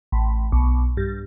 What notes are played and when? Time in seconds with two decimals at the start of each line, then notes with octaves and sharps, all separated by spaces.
0.12 A1
0.52 B1
0.97 G2